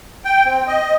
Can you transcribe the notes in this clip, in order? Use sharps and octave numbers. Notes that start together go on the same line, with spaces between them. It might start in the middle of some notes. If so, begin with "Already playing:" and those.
G5
C4
D#5